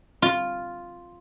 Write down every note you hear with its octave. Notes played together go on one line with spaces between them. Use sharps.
F4